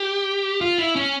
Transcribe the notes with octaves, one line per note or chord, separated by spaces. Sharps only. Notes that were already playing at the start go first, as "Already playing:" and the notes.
Already playing: G4
F4
E4
C#4